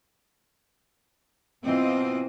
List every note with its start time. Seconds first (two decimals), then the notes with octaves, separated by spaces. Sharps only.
1.62 B2 E3 C4 F4 D#5